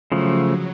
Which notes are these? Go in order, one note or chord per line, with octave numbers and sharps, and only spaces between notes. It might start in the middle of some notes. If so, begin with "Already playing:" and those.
C#3 F3 F#3 A3